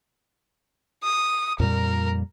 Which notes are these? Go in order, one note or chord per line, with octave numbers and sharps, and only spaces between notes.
D#6
F2 A#2 G3 A#4